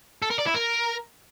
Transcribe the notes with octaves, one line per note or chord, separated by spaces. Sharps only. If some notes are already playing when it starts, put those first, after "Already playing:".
A4
A#4
D5
E4
A#4